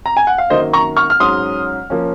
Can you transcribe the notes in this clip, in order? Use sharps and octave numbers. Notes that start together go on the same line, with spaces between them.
A#5
G#5
F#5
F5
F#2 D#3 A#3 C5 D#5
A#5 C#6
C#6 F6
F6
G#2 F#3 C#4 C6 D#6
F3 A#3 C#4